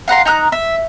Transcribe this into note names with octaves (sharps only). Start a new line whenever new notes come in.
F5 F#5 A#5 C6
D#4 A#5 E6 F#6
E5